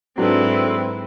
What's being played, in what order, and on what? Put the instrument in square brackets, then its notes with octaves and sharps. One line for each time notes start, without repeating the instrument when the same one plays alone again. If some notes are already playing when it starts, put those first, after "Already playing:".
[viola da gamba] G#2 E4 [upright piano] F#3 D4 [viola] C4 B4 [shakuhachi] A4